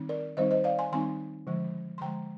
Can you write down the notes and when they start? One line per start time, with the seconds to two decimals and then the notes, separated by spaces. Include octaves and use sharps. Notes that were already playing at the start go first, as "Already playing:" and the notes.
Already playing: D#3 G3 C4 D#4
0.09 A#4 D5
0.37 D#3 G3 C4 D#4 C5 D#5
0.51 C5 D#5
0.64 D5 F5
0.79 G#5 C6
0.92 D#3 G3 C4 D#4 G#5 C6
1.47 D3 F3 G#3
1.98 C6
2.01 D3 F3 G#3 G5 A#5